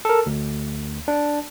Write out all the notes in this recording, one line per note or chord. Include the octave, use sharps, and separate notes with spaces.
A4 A#4
D2
D4